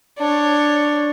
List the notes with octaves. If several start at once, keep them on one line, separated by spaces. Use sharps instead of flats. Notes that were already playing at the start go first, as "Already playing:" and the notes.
D4 C#5